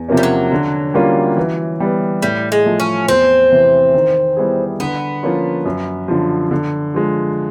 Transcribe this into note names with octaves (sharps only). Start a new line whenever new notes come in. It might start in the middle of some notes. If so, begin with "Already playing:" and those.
Already playing: E2
C3 F3 A#3 C#4
G3
F#3
D3
G3 A#3 C#4 F4
E3
G3 B3
A2 G3
G#3
F3 A3
C#4
E2 C4
C3 E3
D#3
G3 B3 E4 G#4
D3 B3
F3 A#3 C#4 F4
F#2
D3 F3
D3
F3 G#3